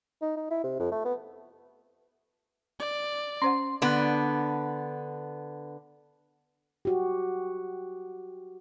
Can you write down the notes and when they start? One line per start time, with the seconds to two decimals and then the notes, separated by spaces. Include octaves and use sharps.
0.22 D#4
0.37 D#4
0.51 E4
0.64 C3
0.80 F2
0.92 A3
1.05 B3
2.80 D5
3.42 C#4 C5 F#5 C6
3.82 D3 B3
6.85 F#4 G4